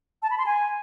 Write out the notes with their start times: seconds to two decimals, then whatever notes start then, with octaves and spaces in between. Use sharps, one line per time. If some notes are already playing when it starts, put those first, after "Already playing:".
0.23 A5
0.30 B5
0.38 C6
0.46 G#5